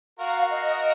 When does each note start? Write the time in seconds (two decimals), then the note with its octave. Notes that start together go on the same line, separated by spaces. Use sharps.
0.19 F#4 A#4 F5
0.51 D#5